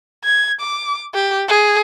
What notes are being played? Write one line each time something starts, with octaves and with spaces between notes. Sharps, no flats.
G#6
D6
G4
G#4